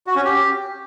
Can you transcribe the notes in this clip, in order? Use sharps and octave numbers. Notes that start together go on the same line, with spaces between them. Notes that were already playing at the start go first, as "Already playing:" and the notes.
F#4
C#4
G4